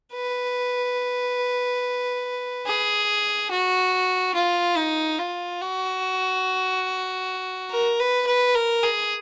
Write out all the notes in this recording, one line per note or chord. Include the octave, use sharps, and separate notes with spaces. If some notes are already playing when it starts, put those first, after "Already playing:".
B4
G#4
F#4
F4
D#4
F4
F#4
A#4
B4
B4
A#4
G#4